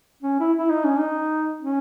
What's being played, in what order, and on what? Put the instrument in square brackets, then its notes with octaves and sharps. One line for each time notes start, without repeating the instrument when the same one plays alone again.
[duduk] C#4
E4
E4
D#4
C#4
D#4
C#4